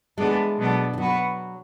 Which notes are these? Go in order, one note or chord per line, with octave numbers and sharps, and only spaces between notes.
E3 G#3 B3 D4 A4
B2 F#3 B3 D4 A4
E3
F#3 B3 F#4 B4